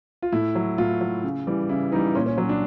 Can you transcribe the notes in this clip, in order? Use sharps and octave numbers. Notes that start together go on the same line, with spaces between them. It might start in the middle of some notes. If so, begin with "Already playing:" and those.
F4
A2 E4
F#3
A2 F4
F#3
C#3
E3 G3
C#3 E4
E3 G3 D#4
A#2 C#4
C#4
F#3 C#4
D4